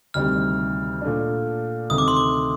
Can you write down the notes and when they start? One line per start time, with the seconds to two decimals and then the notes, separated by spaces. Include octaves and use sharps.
0.14 D2 C3 D#3 G3 F6
1.02 A#2 A3 D4
1.89 D2 C3 D#3 A3 D#6
1.98 D6
2.08 C6
2.17 D6